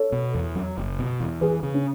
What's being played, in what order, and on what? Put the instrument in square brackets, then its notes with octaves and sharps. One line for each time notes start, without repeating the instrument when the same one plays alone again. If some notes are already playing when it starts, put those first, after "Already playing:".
Already playing: [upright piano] A4 C#5
[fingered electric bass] B2
E2
F#3
F#1
B2
E2
[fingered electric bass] E3 [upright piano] G#4 B4
[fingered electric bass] C#3
[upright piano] C#4